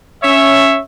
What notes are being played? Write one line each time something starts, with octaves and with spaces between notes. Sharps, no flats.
C#4 C#5 E5